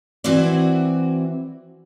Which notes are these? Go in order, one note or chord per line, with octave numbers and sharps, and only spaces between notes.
E3 C4 E4 F#4 D5